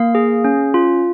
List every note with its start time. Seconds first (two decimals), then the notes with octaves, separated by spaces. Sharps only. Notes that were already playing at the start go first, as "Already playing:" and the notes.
Already playing: A#3 F5
0.15 G#4
0.44 C#4
0.74 F4